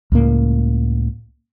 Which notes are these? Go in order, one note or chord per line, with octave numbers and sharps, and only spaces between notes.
C#2 A2 A#3